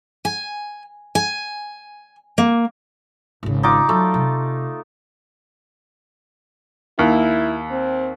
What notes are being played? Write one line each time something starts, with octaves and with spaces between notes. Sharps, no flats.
G#5
G#5
A#3
G#1 C#3
D#4 F4 D6
F#3 A3
C3
D#2 E4
C4